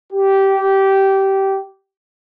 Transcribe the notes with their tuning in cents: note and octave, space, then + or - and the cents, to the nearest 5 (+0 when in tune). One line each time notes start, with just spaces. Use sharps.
G4 -15